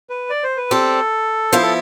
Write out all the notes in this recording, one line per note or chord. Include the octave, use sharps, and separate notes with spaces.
B4
D5
C5
B4
G3 C4 G4 A4
F3 B3 E4 C5
A4